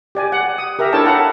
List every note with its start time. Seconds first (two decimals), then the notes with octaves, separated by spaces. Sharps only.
0.15 G4 D5 G#5
0.32 F#5
0.58 D#6
0.79 G4 A#4 E5 A#5
0.93 D4 E4 A4 C#5 G5 A5
1.06 F5 F#5 A5 A#5